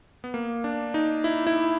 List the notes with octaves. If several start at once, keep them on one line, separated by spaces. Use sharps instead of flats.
B3
A#3
D4
D#4
E4
E4